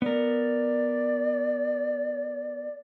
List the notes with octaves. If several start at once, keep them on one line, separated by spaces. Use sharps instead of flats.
B3 A#4 D5